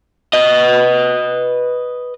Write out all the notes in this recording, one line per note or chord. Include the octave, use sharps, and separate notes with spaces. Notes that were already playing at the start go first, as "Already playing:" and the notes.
B4 D#5